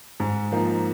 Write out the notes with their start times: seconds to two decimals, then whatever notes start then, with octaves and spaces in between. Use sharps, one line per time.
0.20 G#2
0.52 F3 A#3 D#4